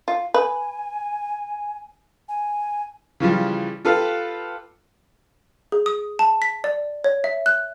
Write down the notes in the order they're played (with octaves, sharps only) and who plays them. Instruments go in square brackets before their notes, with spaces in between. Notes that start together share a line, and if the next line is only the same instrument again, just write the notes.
[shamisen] F4
[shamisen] B4 [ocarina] G#5
[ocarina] G#5
[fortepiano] C#3 E3 F3 G3
F4 G4 A4 B4 F5
[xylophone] G#4
D#6
A5
B6
D5
C#5
E5
F#6